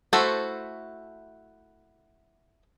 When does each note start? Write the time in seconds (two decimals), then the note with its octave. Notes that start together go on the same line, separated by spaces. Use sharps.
0.13 A3 E4 F#4 A4 C5